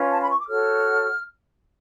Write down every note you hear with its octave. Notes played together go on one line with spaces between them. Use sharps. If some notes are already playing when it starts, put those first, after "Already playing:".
Already playing: C#4 F4 B4
A5
B5
C#6
D6
F#4 A4 C#5 F6